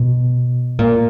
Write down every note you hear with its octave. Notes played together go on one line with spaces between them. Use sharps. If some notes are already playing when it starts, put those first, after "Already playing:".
Already playing: B2
A#2